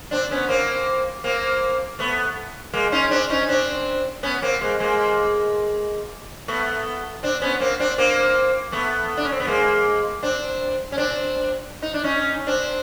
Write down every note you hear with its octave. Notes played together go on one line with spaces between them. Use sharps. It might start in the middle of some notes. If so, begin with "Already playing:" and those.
C4 D4
B3 C#4
A#3 C4
A#3 C4
A3 B3
G#3 A#3
C#4 D#4
C4 D4
C#4 D#4
C4 D4
B3 C#4
A#3 C4
G#3 A#3
G#3 A#3
A3 B3
C4 D4
B3 C#4
A#3 C4
C4 D4
A#3 C4
A3 B3
D4
C#4
C4
B3
G#3 A#3
C4 D4
C#4
C4 D4
D#4
D4
C#4 D#4
C4 D4